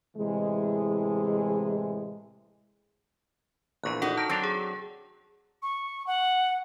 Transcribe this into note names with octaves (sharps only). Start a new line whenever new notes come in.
A2 C3 E3 G#3
A#1 E2 A#2 C#6 F#6
D#4 F#4 A4
A#4 G5 A5
F#3 C4 D4 A#5
G#4
C#6
F#5